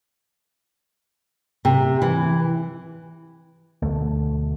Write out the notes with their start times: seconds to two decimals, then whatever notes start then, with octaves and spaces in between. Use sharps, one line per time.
1.65 C3
2.02 E3
3.82 D2 B2 D3 A3